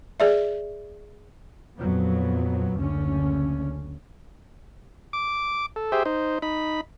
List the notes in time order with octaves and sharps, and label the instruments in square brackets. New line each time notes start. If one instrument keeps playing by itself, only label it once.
[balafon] G#4 D5 E5
[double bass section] F2 A#2 F#3 B3
F#1 D2 D3 C#4
[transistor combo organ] D6
A4
G4 G#4 C5 E5
D#4 C5
D#4 B5